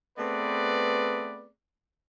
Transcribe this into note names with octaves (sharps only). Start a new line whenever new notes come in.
A3 B3 C4 G#4 B4 D5